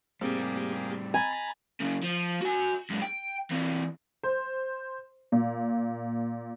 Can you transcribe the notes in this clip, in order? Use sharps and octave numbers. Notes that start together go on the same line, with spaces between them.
A2 G3 A#3 C4 G4 G#4
G#5 A#5 B5 A6
F#2 C#3
F3
F#4 G#5
F#2 G#3
G5
E3 C4
C5
A#2